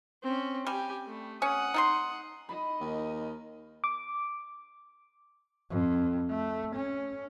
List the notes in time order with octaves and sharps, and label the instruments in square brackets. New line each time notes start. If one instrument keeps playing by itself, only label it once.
[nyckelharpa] C4 C#4
[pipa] G3 [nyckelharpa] G4 G#5
[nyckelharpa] A3
[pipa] C#4 [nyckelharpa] F#5 D#6
[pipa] D#4 A4 C6
[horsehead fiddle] D#4 D#5 [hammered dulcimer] B5
[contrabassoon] D#2 [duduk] A#4
[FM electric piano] D6
[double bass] F2
A3
C#4